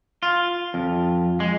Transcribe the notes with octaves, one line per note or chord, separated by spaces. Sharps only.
F4
F2
G#3